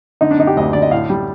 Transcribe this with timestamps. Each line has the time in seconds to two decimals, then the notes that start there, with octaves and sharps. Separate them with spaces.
0.21 D3 D#4
0.31 D4
0.39 D3 D#4
0.47 G4
0.57 D2 D#5
0.73 D3 D5
0.82 D#5
0.91 A2 F5
1.10 G3